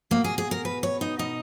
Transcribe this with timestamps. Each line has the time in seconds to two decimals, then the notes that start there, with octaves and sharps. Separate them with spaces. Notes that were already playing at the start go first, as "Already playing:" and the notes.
0.11 B2 A#3
0.24 G#4
0.38 G#4
0.51 A#4
0.65 B4
0.83 C#5
1.01 D#4
1.19 B2 D#4